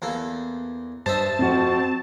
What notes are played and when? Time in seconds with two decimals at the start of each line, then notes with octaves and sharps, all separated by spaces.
0.02 E2 A#3 A4
1.06 G2 C5 D#5 E5 A5
1.39 F2 F3 C4 F#4